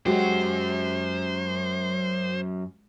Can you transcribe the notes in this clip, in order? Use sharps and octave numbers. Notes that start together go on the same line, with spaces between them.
F#2 F#3 G#3 F#4 G4 C5